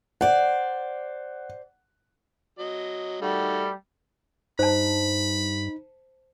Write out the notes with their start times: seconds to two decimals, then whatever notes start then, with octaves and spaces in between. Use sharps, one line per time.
0.21 C5 D5 F#5
2.59 F#3 D#5
3.22 D#3 G3 A3 F#4
4.59 G2 D#4 C5 A5 B5